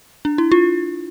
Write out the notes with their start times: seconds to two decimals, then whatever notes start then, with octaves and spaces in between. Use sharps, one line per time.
0.25 D4
0.38 E4
0.52 F4